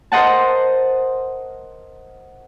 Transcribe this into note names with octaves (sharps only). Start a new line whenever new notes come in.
A#4 C5 D#5 F#5 A5